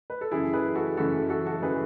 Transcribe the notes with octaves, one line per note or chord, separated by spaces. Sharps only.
B4
A4
F#2 C#3 E3 E4 G#4
G#4 B4
F#4 A4
F#2 C#3 E3 F#4 A4
F#4 A4
F#4 A4
C#3 E3 G#4 B4